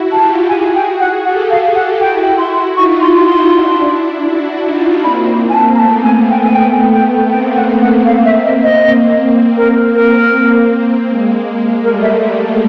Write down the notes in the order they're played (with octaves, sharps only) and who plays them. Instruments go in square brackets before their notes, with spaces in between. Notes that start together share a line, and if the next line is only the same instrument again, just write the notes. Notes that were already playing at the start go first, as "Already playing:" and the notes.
Already playing: [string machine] E4 F#4
[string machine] F4 G4 [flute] A5
[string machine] F#4 G#4 [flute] G#5
[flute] G5
F#5
[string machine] G4 A4 [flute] F#5
[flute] F5
F#5
[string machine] E4 F#4 [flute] G5
[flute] C6
[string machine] D#4 F4 [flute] C#6
[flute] C6
C6
[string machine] D4 E4
E4 F#4
D#4 F4
[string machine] A#3 C4 [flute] B5
[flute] G#5
A5
A#5
[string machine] A3 B3 [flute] A5
[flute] G#5
G5
G#5
G5
G5
[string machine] A#3 C4 [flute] G5
[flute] F#5
F#5
F5
E5
D#5
D#5
[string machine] A#3 C4 [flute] A#4
[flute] A#4
[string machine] A#3 C4
G#3 A#3
G#3
[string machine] G3 A3 [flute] A#4
[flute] E5